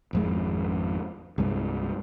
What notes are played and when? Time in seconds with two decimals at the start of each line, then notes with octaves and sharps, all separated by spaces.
0.13 G#1 F2 G#3
1.38 C2 G2 G#3